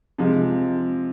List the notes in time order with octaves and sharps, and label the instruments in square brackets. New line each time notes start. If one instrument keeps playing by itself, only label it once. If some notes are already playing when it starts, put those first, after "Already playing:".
[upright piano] C3 F3 G#3